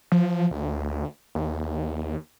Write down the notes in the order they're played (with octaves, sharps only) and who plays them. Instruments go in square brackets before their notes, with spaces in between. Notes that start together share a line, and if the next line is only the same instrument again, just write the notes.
[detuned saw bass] F3
D2
D#2